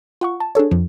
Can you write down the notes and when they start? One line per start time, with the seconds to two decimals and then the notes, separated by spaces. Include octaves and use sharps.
0.21 F4 F#5 C#6
0.40 A5
0.55 D4 G#4 A4 C#5
0.71 F2 F3